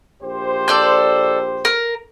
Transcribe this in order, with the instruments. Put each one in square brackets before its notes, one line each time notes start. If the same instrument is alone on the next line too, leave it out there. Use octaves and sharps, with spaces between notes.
[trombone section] A#1 G4 C5
[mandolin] A4 D5 G6
A#4